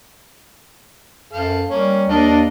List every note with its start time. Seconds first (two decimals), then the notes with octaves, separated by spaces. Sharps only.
1.33 F#2 A4 F5
1.70 G3 A#3 C#4
2.09 D#2 D4 A#4 D#5 F5